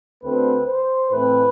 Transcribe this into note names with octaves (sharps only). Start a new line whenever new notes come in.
D2 D3 A3 C4 B4
C5
A2 E3 A3 C4 B4